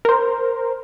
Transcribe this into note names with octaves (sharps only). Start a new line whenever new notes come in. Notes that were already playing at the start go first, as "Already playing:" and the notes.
A#4 C5